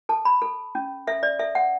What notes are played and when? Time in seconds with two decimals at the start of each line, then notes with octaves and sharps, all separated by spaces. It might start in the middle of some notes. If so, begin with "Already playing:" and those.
0.09 A4 A5
0.25 B5
0.42 A4
0.75 C#4
1.07 A4 E5
1.23 D5
1.39 A4 E5
1.55 F#5